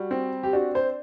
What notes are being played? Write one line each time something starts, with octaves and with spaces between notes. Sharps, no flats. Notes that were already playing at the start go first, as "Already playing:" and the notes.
Already playing: G3 F#4
C4
G4
D4 F#4
C5